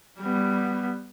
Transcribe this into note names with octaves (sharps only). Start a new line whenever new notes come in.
G3 B3